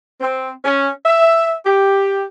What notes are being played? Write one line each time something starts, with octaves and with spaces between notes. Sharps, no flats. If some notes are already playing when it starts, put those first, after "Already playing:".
C4
C#4
E5
G4